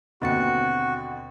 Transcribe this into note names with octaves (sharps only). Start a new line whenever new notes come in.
D#2 B2 D3 C4 F#4 A6 C#7